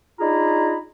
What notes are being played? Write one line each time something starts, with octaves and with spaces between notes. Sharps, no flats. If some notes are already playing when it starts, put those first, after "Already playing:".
D4 D#4 F4 G#4 A#5 B5